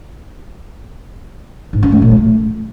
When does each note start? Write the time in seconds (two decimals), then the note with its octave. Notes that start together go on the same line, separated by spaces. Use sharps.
1.73 G#2
1.83 C#4
1.92 A3
2.02 A#2
2.12 A3